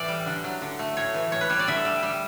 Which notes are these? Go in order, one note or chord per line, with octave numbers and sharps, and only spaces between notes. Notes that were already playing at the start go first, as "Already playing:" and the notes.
Already playing: A2 E3 D5 E5
G3
D3
F#3
D3
A3
A2 C#5
E3
A2 C#5
B4
G3 C#5
D5
D3 E5
G3
G3